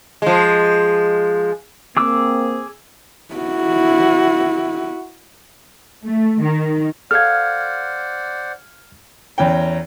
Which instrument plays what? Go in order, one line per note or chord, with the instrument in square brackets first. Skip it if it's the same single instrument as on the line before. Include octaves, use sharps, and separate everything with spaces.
[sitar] F3 G#3
[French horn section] A#3 C4 [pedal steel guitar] G#4 D6 E6
[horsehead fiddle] E4 F#4
[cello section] A3
D#3
[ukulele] A4 F5 [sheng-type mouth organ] C5 D5 F#5 [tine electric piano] F6 G#6
[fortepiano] E2 C#4 G5 [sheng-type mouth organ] A#5